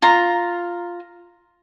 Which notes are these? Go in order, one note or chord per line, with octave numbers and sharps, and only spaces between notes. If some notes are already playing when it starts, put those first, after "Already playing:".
F4 A#5